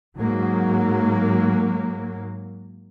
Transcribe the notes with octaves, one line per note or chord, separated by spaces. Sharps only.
G#2 F#3 A#3